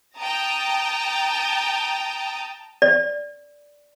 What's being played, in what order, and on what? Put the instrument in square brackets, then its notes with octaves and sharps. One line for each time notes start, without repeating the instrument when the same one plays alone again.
[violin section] G5 A5 A#5 D#6
[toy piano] D5